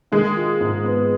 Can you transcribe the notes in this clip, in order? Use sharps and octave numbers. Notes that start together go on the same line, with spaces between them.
D#3 G#3
F4
G#2
B3